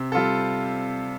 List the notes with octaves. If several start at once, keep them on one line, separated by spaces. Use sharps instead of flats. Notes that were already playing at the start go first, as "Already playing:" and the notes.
Already playing: C3 C4
G3 F4 A4